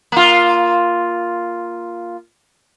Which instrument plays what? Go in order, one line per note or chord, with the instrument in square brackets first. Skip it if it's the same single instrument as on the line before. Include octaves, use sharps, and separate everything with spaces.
[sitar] A#3 F4